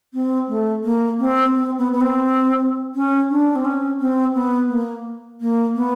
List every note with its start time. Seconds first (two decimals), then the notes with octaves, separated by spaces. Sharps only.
0.14 C4
0.48 A3
0.84 A#3
1.19 C4
1.55 C4
1.78 B3
1.92 B3
2.01 C4
2.95 C#4
3.30 D4
3.55 C4
3.65 C#4
4.00 C4
4.34 B3
4.69 A#3
5.41 A#3
5.75 B3